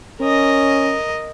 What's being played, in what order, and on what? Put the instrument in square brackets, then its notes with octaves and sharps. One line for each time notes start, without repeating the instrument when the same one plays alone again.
[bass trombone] C#4 [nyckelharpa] A#4 D#5